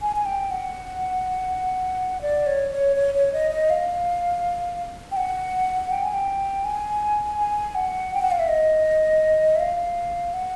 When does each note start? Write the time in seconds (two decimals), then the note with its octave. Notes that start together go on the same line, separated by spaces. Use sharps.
0.02 G#5
0.16 G#5
0.26 G5
0.51 F#5
2.22 D5
2.46 C#5
2.71 C#5
2.96 C#5
3.15 C#5
3.33 D#5
3.51 D#5
3.70 F5
5.12 G5
5.17 F#5
5.91 G5
6.03 G#5
6.14 G5
6.64 G#5
7.38 G#5
7.75 F#5
8.14 G5
8.22 F#5
8.31 F5
8.39 E5
8.48 D#5
9.55 E5
9.60 F5
10.34 F#5